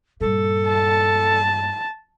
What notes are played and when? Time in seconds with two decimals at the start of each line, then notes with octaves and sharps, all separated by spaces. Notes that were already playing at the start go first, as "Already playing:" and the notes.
0.21 G2 A#2 A4
0.68 A5